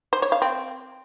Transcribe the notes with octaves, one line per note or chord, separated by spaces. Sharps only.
C5
C#5
F5
C4